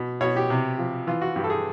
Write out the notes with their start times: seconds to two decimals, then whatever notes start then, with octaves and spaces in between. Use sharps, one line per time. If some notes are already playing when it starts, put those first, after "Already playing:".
Already playing: B2
0.21 B2 C#5
0.36 G4
0.50 C3
0.78 F3
1.07 E3 F4
1.21 F#4
1.36 G2 G4
1.44 A4
1.50 G#4